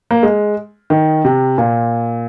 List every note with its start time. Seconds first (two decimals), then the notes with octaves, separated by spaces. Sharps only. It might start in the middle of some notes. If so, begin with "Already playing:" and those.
0.11 A#3
0.23 G#3
0.90 D#3
1.25 C3
1.58 A#2